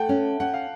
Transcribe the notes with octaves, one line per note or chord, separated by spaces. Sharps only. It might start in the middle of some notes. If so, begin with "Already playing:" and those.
Already playing: A3 F#5 G5 A5
C#4
C#4 F#5
F5